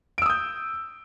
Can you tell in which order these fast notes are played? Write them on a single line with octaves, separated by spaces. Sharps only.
D7 E6 D#6 G6